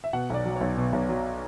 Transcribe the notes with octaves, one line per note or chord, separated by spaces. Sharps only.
E5
B2 F#5
B1 D5
F#3
C#5
B1
B2
B1
F#3